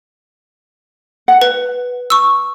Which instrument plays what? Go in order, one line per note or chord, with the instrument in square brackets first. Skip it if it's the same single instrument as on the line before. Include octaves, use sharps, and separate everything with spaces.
[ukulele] F#5
[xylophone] B4
C#6 E6